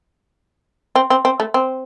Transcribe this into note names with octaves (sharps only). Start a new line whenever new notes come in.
C4
C4
C4
A3
C4